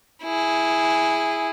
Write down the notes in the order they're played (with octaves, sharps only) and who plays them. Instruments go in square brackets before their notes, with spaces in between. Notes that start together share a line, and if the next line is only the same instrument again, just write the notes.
[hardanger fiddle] E4 G#4